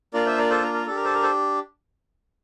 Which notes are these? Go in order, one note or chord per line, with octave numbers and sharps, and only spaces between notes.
A#3 D4 F4 A#4 D5
C5 E5
A#4 D5
A4 C5
A#4
A#4
D4 G4 A4
A#4
A4 C5
A#4
A4 C5